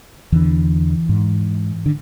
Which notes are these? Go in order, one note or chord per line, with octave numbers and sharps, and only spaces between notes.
E2 D3 E3
G#2
D3